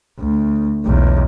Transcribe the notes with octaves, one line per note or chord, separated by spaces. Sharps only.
D2
B1 E2